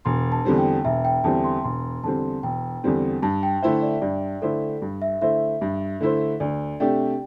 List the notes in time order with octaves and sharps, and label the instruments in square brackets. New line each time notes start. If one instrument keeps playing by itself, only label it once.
[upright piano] E1 [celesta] C6
[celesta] A5
[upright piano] E2 D3 G3 C4
[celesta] G5
[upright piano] E1 [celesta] E5
[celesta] G5
[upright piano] E2 D3 G3 C4 [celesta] A5
[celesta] C6
[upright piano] E1 [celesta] C6
[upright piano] E2 D3 G3 C4 [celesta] A5
[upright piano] E1 [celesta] G5
[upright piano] E2 D3 G3 C4
[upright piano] G2 [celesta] A5
[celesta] G5
[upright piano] D3 A3 E4 C5 [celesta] E5
[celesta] D5
[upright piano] G2 [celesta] D5
[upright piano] D3 A3 E4 C5 [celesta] A4
[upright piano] G2
[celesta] E5
[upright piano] D3 A3 E4 C5 [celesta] E5
[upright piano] G2
D3 A3 E4 C5
[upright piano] D2 [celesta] D5
[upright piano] C3 A3 D4 G4 [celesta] G5